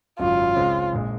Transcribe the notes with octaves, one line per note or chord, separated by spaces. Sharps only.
G#1 F#2 C#3 F#3 F4
C#2 C#3 G#3 C4
A#1 A#2 G#3